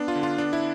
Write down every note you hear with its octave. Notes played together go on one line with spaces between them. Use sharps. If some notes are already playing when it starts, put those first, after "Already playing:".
Already playing: B3 D4
F4
D3
F4
B3 D4
E4